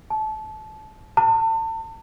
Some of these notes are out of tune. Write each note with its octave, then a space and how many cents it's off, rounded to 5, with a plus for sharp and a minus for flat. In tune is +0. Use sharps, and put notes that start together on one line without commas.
A5 -25
A5 +35